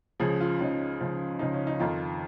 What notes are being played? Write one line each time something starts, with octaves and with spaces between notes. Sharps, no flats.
C#2 C#3 F3 G#4
F4
C#2 C#3 F3 D#4
C#2 C#3 F3
C#2 C#3 F3 D#4
C#4
D#4
F2 D#3 F4